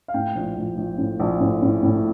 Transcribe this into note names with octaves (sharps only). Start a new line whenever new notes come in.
F5
A2 G5
A#1
A#1
A#1
A2
A#1
A2
A2
A2